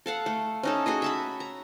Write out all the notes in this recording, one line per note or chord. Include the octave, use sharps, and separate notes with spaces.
A4 F5 F#5
A3
C#4 D#4 A4
F#4 G#4 C#5 D#5
E5 A5 B5
A#5